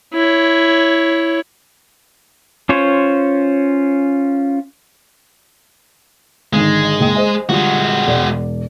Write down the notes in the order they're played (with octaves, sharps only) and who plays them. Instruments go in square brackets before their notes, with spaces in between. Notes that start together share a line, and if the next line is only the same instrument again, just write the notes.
[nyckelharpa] E4 C#5
[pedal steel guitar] C#4 F4 C5 C#5
[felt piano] G#1 D3 D#3 [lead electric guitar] G#3
[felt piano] F#1 A#3 G5
C5 D#5 G#5
[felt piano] D3 G3 F4 [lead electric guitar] G#3 F#4
[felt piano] E1 D5